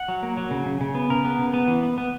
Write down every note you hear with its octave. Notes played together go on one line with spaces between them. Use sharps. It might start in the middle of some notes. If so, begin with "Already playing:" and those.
Already playing: F#5
F#3
A#3
F#3
C#3
C#3
C#3
B3
C#3 A#4
B3
C#3
B3
E3
B3
B3